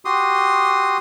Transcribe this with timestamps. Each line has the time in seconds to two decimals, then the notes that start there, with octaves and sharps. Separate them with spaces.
0.05 F#4 G4 C6 D#6